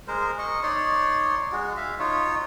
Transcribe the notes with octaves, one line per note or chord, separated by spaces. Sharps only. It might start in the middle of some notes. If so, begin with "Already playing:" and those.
G#3 A#4 C5
D#5 C#6
D#4 C#5 D5 C6
G#3 F#4
E5 F5
D#4 F4 C#5